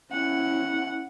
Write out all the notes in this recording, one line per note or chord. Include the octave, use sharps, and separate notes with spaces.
C#4 E4 F#5